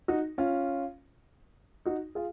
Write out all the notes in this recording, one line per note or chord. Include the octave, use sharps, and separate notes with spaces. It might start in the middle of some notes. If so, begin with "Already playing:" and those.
D#4 F#4
C#4 F4
D#4 F#4
F4 G#4